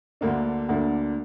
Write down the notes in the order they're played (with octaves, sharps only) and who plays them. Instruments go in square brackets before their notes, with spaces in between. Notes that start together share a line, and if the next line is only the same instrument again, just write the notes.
[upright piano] D2 D3 A#3 D4
D2 D3 A#3 D4